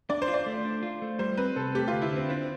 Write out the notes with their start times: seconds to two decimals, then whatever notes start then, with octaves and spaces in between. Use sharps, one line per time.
0.10 D4 D5
0.22 C5
0.28 F4
0.34 D5
0.46 A3
0.65 D4
0.83 F4
1.02 A3
1.19 G3 C5
1.37 C4 B4
1.56 C3 A4
1.75 A3 G4
1.88 D2 F4
2.02 E4
2.11 D3
2.16 C4
2.29 C4 D4